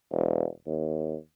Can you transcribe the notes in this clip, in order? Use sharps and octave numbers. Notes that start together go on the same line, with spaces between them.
E1
D#2